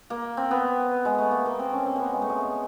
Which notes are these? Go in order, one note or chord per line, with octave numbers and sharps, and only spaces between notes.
A#3
C4
B3
G#3
A3
A#3
A#3
C4
C#4
C4
A#3 B3
G#3
A3
G#3